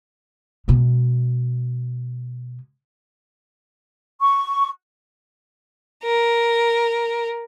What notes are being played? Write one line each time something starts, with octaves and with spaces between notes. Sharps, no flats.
B2 G#3
C#6
A#4